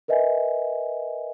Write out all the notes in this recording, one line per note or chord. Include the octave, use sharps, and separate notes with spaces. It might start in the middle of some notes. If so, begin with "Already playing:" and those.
A#4 B4 D#5 E5 G#5